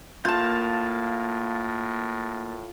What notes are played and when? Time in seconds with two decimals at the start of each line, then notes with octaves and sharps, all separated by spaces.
0.25 A2 A#3 F4 A5 G6